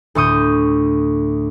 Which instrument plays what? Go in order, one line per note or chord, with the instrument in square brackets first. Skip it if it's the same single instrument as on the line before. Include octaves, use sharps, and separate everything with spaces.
[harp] D2 A2 C#6 D#6 G6